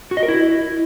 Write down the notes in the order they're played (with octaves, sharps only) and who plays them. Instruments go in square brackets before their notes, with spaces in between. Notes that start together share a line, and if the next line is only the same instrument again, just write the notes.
[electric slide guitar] F#4
D#5
A#4
E4